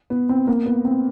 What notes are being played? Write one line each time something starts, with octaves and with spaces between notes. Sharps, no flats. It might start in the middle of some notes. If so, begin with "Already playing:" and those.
B3
C4
A#3
B3
C4